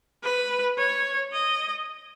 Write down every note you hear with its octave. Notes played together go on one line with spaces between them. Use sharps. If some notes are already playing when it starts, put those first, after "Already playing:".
B4
C#5
D#5